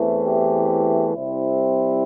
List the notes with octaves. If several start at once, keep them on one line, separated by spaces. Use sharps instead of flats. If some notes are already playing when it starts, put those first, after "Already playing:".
Already playing: E2 E3 A3 C4
G4
C2 C3 G3 C4 E4